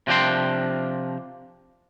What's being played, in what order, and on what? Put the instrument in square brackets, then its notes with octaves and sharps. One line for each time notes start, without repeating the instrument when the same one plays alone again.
[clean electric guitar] C3 F3 D4 G5 C6